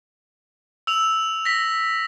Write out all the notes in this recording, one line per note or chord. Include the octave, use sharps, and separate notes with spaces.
E6 F7
A#6 B6